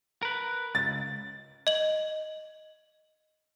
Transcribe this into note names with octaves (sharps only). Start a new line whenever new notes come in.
A#4 B4
C#2 A6
D#5 F#7